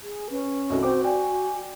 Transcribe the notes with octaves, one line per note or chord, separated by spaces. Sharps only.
G#4
C#4 B4
C2 A3 D#4 F#4
C4 C5 G5 D6
D5 G5 G#5